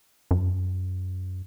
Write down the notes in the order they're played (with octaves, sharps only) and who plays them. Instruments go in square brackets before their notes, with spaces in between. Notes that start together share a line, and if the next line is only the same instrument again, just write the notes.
[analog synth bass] F#2